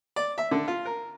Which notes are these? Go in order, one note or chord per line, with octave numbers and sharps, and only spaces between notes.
D5
E5
D3
F4
A#4